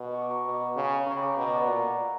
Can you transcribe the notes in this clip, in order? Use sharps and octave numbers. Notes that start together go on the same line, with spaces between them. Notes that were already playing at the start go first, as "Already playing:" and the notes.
Already playing: B2
C#6
D6
A#5 C#6
B2
C#3
C#3 A#5 C#6
G5 B5
D6
A#5 C#6
B2 B5 D6
A#5 C#6
D5 F#5
A#2 F#5 A#5